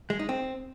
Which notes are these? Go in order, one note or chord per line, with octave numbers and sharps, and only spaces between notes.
G#3
D#4
C4